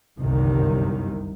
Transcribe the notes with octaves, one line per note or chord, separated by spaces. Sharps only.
G1 C2 F#2 C3 D#3